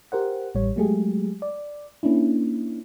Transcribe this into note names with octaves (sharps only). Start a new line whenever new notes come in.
G4 A#4 C5 F#5
A1 G3 C#5
F#3 G#3 A3 G4 G#4
D5
A#3 C#4 D4 E4